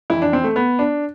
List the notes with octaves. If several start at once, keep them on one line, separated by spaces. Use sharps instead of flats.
F2 E3 E4
D4
C4
A3
B3
D4